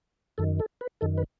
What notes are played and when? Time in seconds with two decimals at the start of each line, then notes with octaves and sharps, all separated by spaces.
0.38 F#2 D#3 A4
0.60 A4
0.81 B4
1.01 F#2 D#3 A4
1.18 B4